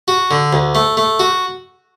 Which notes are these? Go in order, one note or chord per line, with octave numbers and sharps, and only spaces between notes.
F#4
D3
D2
A3
A3
F#4